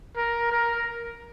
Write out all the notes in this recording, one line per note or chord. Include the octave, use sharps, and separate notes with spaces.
A#4
A#4